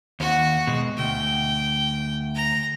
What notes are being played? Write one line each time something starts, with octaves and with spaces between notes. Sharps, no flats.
D#2 F#4 F#5
B2 G#3
D2 G5
A#5